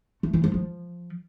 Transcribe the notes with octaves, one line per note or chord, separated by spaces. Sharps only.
A3
E3
F3
F3